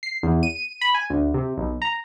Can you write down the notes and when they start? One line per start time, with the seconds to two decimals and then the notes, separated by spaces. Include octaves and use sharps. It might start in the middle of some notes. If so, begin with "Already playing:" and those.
0.03 C7
0.23 E2
0.43 D#7
0.81 B5
0.94 G#5
1.10 D2
1.34 C3
1.58 B1
1.82 A#5